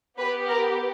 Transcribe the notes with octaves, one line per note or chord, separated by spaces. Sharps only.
B3 G4 B4
A#4